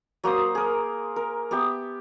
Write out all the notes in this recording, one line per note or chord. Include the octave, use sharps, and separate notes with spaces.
F#3 A#3 C5 D#6
G#4 A#4
A#4
B3 G4 E5